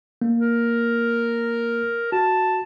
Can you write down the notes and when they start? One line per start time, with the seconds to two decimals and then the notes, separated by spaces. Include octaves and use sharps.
0.22 A#3
0.40 A#4
2.12 F#4 A5